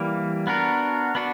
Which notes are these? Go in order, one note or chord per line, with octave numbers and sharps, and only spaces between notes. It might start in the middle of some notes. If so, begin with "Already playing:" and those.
Already playing: E3 G3 A#3
B3 D4 F#4 A#4
B3 D4 F#4